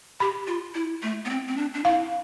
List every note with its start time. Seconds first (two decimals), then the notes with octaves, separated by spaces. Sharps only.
0.20 G4 B5
0.47 F4
0.75 E4
1.03 A3
1.25 B3
1.30 C4
1.48 C4
1.57 D4
1.74 D4
1.84 E4 F5